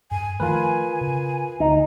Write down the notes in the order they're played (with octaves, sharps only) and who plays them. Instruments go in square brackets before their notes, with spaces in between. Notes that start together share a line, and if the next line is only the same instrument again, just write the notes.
[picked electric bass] G2 [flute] G#5
[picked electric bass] D#3 F3 A3 [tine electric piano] F4 A#4 B4 [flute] G#5
[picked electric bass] C#3
[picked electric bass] D2 D3 [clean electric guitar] D#4